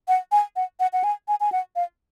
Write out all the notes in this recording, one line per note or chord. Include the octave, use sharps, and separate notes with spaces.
F#5
G#5
F#5
F#5
F#5
G#5
G#5
G#5
F#5
F5